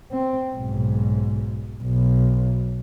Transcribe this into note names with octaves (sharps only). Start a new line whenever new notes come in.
C4
B1 G#2
B1